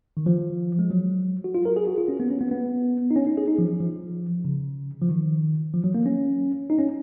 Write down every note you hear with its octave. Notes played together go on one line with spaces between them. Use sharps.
D#3
F3
G#3
F#3
F#4
F4
A#4
G#4
F#4
F4
C#4
B3
C#4
B3
B3
D#4
C#4
D#4
G#4
D#4
F3
F3
C#3
F3
D#3
F3
F#3
A#3
C#4
D#4
C#4